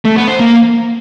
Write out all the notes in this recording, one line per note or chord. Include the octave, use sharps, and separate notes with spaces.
A3
B3
C5
A#3